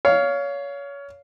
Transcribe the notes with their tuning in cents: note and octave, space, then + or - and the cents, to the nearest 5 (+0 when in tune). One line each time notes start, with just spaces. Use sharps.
C#5 +25 F5 +0